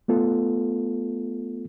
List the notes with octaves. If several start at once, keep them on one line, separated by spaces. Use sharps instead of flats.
A3 B3 F4 A4